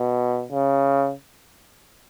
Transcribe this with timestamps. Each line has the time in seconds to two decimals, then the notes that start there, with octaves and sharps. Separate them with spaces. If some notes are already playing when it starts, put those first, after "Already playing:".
Already playing: B2
0.51 C#3